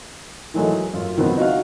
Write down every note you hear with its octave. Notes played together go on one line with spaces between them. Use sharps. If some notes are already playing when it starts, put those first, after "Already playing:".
D#3 E3 F#3 G#3 A3
F#2 F4
C#2 D#3 F#3 B3 C4
D#4 F#4 E5 F5